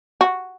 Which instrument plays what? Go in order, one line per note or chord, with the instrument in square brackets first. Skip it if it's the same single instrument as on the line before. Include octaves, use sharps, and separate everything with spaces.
[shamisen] F#4